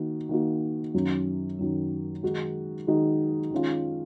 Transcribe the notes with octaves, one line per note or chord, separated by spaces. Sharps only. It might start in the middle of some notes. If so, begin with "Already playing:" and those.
Already playing: D#3 A#3 D#4 F#4
D#3 A#3 D#4 F#4
F#2 D#3 F#3
F#2 D#3 F#3
D#3 G#3 D#4 F#4
D#3 G#3 D#4 F#4
D#3 G#3 C#4 F4